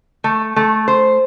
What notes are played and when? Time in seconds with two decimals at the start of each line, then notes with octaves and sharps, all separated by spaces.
0.24 A3
0.56 A3
0.88 C5